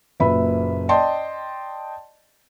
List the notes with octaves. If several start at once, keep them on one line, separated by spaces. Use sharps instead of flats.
F#1 A#2 B4 E5 B5
D5 D#5 G5 A5 C6